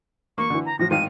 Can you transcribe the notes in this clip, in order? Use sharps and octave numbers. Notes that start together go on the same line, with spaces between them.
A#3 C#6
D3 E3
A#5
A2 F3 A#6
G#1 A2 F5 D#7